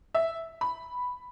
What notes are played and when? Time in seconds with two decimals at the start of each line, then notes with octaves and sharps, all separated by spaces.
0.15 E5
0.61 B5